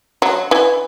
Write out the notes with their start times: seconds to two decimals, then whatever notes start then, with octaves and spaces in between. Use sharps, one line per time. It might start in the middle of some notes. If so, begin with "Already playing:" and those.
0.22 F#3
0.51 E3